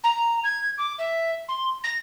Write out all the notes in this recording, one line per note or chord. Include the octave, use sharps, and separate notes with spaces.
A#5
G#6
D6
E5
C6
A#6